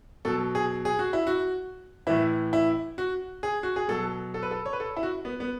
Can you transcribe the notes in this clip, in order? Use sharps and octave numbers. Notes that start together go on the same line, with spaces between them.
B2 F#3 A4
G#4
G#4
F#4
E4
F#4
A2 E3 E4
E4
F#4
G#4
F#4
G#4
B2 F#3 A4
A4
B4
A4
C#5
B4
A4
E4
F#4
B3
B3